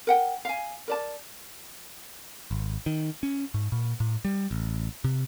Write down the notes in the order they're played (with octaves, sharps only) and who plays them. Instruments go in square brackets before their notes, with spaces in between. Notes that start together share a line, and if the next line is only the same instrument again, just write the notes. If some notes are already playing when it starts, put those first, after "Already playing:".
[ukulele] A#4 F#5 G5
F5 G#5
A#4 D5 A5
[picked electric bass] G#1
D#3
C#4
G#2
A#2
A2
G3
A1
C3